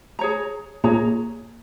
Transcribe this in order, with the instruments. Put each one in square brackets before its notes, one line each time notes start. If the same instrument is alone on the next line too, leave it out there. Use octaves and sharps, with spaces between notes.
[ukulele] G#4 C#5 A#5
[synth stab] A#2 [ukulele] G#4 C#5 A#5